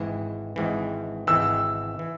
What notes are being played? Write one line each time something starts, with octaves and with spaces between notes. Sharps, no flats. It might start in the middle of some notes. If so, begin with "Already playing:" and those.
Already playing: G#1 G#2 E3
G#1 G#2 E3
G#1 G#2 E3 E6
E3